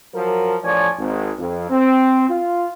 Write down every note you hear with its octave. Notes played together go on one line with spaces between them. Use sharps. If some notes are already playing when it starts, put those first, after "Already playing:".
F3 F#3 A#4
A1 F3 C#5 D5 G#5
G#1
F2
C4
F4